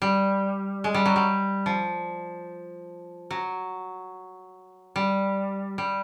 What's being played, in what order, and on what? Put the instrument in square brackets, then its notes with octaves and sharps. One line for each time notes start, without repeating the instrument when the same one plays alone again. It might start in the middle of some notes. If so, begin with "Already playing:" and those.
[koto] G3
G#3
G3
F#3
G3
F3
F#3
G3
G3